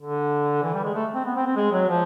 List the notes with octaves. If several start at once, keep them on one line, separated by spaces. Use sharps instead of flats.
D3
E3
G3
G#3
A3
C4
B3
C4
C4
G#3
F#3
F3